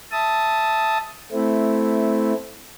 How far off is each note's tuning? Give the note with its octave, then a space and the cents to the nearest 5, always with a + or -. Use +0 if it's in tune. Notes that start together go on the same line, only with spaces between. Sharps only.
E5 +0 A5 +0 D#6 +10
A3 -10 C4 -10 E4 +0